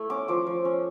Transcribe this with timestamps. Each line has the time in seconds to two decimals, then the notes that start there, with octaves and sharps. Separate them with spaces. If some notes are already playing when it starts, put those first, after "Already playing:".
Already playing: A3 E4
0.10 C#4 D6
0.28 F3 D6
0.47 F3
0.65 C#4